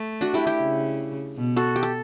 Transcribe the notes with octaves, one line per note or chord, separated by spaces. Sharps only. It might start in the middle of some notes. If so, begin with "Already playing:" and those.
Already playing: A3
D4 F#4
E4 G4
E4 G4
C#3
B2
F#4 A4
G4
A4